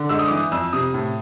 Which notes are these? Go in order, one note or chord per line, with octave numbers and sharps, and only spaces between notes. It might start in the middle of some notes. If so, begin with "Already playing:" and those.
Already playing: D3
G#2 E6
D#6
E3 D6
D#6
F2 E6
C3 D#6
A2